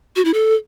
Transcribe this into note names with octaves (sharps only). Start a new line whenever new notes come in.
F#4
E4
A4